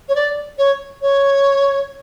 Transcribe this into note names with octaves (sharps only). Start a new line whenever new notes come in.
C#5
D5
C#5
C#5